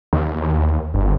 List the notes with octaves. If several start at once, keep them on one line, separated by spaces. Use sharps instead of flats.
D#2
G1